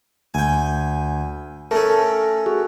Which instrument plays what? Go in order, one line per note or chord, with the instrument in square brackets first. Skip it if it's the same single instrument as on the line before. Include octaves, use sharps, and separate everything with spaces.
[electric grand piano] D2 [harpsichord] G5 G#5
[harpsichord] A3 C#4 [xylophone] A4 A5 [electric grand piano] A#4
[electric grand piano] F#4 [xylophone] G#4